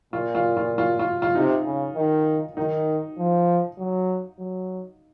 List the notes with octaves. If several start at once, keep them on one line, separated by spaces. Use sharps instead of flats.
A#2 F4
F4
F4
F4
F4
F4
C3 D#4
C#3
D#3
D#3 D#4
F3
F#3
F#3